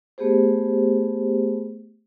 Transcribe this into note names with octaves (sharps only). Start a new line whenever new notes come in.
A3 B3 G4 G#4 C5